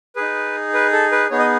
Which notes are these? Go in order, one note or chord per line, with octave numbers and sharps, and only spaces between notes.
D#4 G#4 B4
B4
A4
B4
B3 D#4 G#4 C#5
D#5